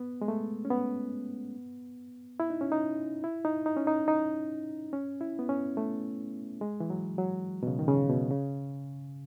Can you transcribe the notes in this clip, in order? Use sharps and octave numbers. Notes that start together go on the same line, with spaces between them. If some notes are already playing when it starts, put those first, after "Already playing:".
Already playing: B3
G#3
A3
C#4
B3
E4
D#4
C#4
D#4
E4
D#4
D#4
C#4
D#4
D#4
C#4
E4
B3
C#4
A3
G#3
E3
F#3
F#3
B2
C#3
D#3
C#3
B2
C#3